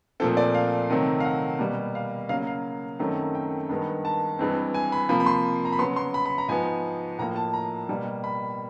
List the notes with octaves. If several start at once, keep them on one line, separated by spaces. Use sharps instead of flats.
A#2 F3 A3 C4 A4
D5
F5
C3 D#3 F#3 A3 C4
F5
F#5
B2 G3 A#3
F5
C#3 F#3 A#3 F5
F5
F#2 D#3 F#3 A3 C4
G5
G2 D#3 G#3 B3
A5
G2 E3 G#3 C4
G#5
B5
C3 F3 A#3 B5
B5
C6
A#5
B5
C#3 F#3 B3 C6
C6
B5
B5
A#5
G#2 F3 G#3 B3 G#5
A2 F3 A#3 A#5
A5
A#5
B2 G3 A#3
B5